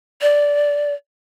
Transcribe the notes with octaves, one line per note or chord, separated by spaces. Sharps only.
D5